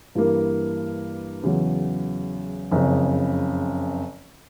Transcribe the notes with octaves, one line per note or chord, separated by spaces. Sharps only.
G2 E3 G3 A#3
E2 C#3 F#3
F#1 F2 C#3